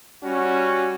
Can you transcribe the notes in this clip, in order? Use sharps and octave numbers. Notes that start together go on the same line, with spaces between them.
G3 C#4 F#4